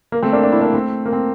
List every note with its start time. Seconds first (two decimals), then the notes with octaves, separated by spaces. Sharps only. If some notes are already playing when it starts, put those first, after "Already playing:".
0.12 A#3
0.22 A3 C4
0.33 A#3 D4
0.43 D4
0.52 E4
0.61 A#3 D4
0.74 A3 C4
1.06 A#3
1.13 C4